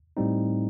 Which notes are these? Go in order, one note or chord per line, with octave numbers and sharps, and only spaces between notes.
A2 G3 C4 D#4